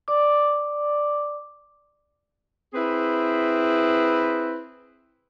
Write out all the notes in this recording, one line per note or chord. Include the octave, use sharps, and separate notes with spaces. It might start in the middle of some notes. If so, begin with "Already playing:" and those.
D5 D6
C4 E4 G#4 B4